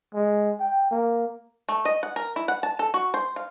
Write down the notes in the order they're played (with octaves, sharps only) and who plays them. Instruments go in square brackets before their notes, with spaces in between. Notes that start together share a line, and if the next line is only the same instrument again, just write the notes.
[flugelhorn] G#3
G5
A#3
[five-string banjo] A3
D#5
F#5
A#4
E4
F#5
A5
A4
F#4
C5
F5